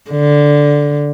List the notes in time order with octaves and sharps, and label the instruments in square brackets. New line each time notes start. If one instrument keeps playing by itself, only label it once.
[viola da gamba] D3